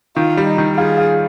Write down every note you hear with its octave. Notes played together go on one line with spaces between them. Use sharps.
D#3 F4
G3
D#4
D#3
F4 G#4
F4